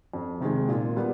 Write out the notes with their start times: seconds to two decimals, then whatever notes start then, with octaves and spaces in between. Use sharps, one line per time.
0.14 F2
0.40 C3 D#3 G#3
0.68 A#2
0.96 G3 B3